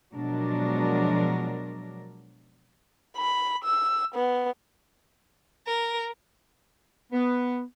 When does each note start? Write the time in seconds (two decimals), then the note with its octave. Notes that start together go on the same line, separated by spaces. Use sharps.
0.14 B2 F3 F#3 G#3 D4 A#4
3.17 B5
3.64 E6
4.15 B3
5.66 A#4
7.12 B3